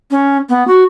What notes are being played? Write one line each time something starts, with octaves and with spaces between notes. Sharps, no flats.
C#4
B3
F#4